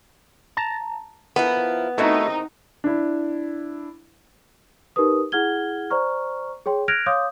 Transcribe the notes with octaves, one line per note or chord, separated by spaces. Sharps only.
A5 A#5
F3 B3 E4 A#4
E2 D#3 A3 C4 D#4 E4 F#4
D4 E4
D#4 G4 A#4 B4 D#6
E4 G#4 F#5 F6 G#6 G7
C5 D5 A#5 C#6 F6
G#4 C#5 G5 C6
F6 F#6 G#6 A#6 D7 F7
C#5 F5 C6 D6 D#6 G6